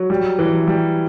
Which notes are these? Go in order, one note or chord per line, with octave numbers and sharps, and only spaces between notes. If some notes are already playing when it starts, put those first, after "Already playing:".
Already playing: F#3
G3
E3
G3